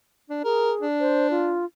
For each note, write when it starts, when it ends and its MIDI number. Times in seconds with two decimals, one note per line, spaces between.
0.30 0.40 62
0.44 0.86 68
0.44 0.72 70
0.81 1.62 62
1.00 1.30 72
1.31 1.65 65